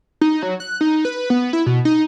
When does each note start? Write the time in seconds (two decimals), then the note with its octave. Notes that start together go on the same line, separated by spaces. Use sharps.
0.21 D#4
0.42 F#3
0.60 F#6
0.81 D#4
1.05 B4
1.30 B3
1.53 E4
1.66 B2
1.85 D#4